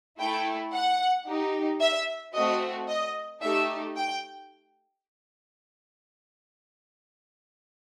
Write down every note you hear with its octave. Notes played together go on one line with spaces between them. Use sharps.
A3 E4 A4 G5
F#5
D#4 G4
E5
A3 C4 F#4 D#5
D#5
A3 D#4 G4 E5
G5